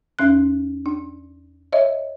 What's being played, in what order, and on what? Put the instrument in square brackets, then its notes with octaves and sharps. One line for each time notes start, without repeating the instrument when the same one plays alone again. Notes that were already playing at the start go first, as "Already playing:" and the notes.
[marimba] E2 C#4 F#6
D4
C#5 D#5 E5